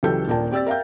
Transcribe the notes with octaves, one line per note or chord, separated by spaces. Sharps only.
C#2 E3 F#3 G4 A4 G6
D#1 A#2 A#3 D4 G5 A5
C4 G4 D5 E6 A6
A#4 E5 F5 G5 G6